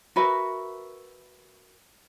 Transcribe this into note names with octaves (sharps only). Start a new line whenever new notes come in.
F#4 A#4 B4 E5